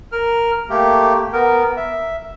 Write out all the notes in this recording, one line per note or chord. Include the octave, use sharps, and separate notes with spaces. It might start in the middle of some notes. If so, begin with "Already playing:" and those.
A#4 F6
A3 A#3 G4
B3 A#4
E5